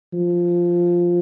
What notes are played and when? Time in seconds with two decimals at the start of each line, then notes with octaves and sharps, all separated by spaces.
0.13 F3